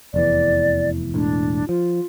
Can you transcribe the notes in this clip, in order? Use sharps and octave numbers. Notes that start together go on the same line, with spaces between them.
F1 E2 E3 D5
E1 A2 D4
F3 F4